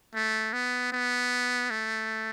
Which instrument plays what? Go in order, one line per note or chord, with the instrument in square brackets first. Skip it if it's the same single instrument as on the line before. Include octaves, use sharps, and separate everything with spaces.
[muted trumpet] A3
B3
B3
A3